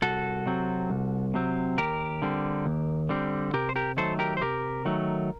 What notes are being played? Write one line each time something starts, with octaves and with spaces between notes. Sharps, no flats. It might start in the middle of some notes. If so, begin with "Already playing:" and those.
C2 F#4 A4
C3 F#3 C4
C2
C3 F#3 C4
D#2 G4 A#4
D3 G3 C4
D#2
D3 G3 C4
C3 G4 A#4
C5
G4 A#4
D#3 F#3 A3 A4 C5
G4 A#4
C5
C3 G4 A#4
D#3 F#3 A3